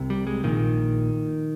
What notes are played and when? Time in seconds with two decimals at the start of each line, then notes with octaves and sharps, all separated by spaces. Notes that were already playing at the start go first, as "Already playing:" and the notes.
Already playing: C2 C3
0.10 G3
0.27 G#3
0.43 A#1 A#2 D#3